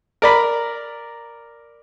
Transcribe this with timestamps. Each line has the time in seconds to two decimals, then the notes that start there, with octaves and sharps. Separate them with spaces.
0.22 A#4 D5 B5